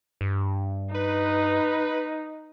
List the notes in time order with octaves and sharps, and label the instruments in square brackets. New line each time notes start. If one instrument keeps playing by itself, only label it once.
[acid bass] G2
[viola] D#4 [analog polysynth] B4